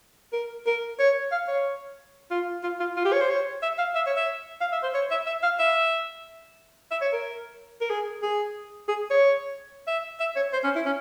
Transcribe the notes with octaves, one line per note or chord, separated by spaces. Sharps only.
A#4
A#4
C#5
F5
C#5
F4
F4
F4
F4
G4
C#5
C5
C#5
E5
F5
E5
C#5
E5
F5
E5
C5
C#5
E5
E5
F5
E5
E5
C#5
A#4
A#4
G#4
G#4
G#4
C#5
E5
E5
C#5
C5
C#4
E4
C#4